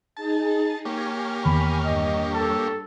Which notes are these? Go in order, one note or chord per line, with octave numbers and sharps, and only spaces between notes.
D#4 G#4 A5
A#3 G4 C#5 G#5 F6
E2 D#3 B5
G2 D#5
A4